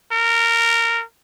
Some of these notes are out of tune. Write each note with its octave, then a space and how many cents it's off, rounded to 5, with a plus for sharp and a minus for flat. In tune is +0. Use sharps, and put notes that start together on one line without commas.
A#4 -15